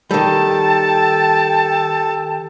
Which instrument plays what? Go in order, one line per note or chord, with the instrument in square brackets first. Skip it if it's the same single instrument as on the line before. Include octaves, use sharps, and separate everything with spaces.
[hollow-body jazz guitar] D#3 G3 [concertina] A4 [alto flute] G5 [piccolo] A5